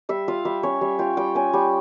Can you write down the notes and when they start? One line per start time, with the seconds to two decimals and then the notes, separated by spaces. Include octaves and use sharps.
0.09 G3 E5
0.28 F4 F5
0.45 G3 E5
0.63 C#4 C#5
0.81 G3 E5
0.99 F4 G5
1.17 G3 G5
1.35 C#4 G#5
1.53 G3 G5